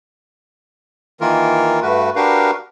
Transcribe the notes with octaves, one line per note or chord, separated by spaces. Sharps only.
D#3 E3 A#3 F4 A#4
G2 A3 F#4 B4
D4 F#4 G4 A#4 B4 F5